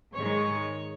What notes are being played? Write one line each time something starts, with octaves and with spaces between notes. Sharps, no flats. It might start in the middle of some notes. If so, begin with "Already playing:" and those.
G#2 D#3 G#3 C#5